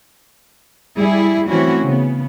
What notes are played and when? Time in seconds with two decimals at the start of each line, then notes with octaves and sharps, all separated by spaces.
0.97 G3 E4 G#4
1.48 E3 A3 C4 C#4 E4 F#4
1.83 C#3 B3